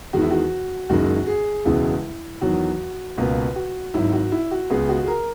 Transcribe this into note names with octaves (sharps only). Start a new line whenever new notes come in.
E2 D#3 G#3 F#4
E4
F#4
F#1 F#2 D#3 G#3 F#4
G#4
E1 E2 C#3 G#3 B3 E4
E2 D#3 F#3 F#4
C#2 B2 A#3 B4
F#4
G#1 G#2 F#3 E4
F#4
E4
F#4
C#2 C#3 G#3 B3 G#4
F#4
G#4
A#4